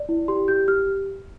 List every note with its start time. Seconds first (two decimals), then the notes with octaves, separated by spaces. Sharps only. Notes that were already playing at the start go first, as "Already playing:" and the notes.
Already playing: D5
0.09 E4
0.28 G4 C6
0.48 G4 G6
0.68 G4 F6